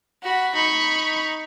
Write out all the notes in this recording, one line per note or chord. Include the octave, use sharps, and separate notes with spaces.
F#4 B5
D#4 B5 C#6